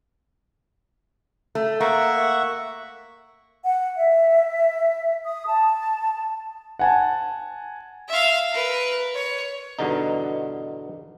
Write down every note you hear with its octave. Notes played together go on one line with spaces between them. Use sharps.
A3
A#3 E5 F#5 C#6
F#5
E5
D#6
A5
F#5 G#5 A5
E5 F5
A#4 B4
C#5
E2 G2 B2 D3 D#4